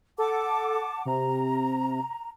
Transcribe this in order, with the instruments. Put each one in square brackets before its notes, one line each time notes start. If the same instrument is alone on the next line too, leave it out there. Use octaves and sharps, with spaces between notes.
[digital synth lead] A4 [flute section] F#5 A5 D6
[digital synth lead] C3 [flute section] A#5